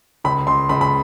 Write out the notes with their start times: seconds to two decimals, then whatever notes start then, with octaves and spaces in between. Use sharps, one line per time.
0.24 C#2 B5
0.47 C#2 C6
0.69 C#2 B5
0.81 B5